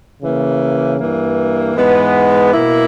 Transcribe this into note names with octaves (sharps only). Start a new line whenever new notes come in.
C#3 E3 A#3
G2 E3 A#3
G#2 E3 G#3 B3
B2 A#3 E4